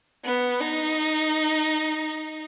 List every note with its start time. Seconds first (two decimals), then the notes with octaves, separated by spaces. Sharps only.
0.25 B3
0.60 D#4